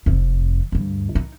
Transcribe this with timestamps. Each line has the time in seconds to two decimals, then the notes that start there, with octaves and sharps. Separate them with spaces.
0.06 F1 F2
0.72 D2 G2
1.15 D#4